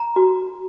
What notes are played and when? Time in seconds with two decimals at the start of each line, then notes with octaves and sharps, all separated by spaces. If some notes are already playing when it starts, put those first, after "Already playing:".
Already playing: A#5
0.16 F#4